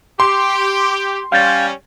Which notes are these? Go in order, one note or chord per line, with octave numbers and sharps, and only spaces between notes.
G4 C6
G3 C#4 F5 G6 A6